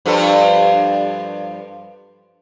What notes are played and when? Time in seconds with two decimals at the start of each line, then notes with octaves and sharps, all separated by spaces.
0.06 G2 F3 A4